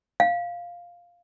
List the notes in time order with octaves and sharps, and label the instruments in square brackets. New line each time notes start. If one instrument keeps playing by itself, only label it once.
[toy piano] F5